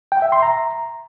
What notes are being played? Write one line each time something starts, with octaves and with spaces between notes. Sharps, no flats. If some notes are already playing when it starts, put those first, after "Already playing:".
G5
E5
C6
A#5